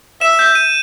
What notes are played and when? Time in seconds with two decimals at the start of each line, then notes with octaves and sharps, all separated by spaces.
0.21 E5 E7
0.39 G6
0.55 D#7